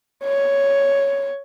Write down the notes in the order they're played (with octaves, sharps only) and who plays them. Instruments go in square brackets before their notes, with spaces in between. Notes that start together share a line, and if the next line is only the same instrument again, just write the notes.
[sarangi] C#5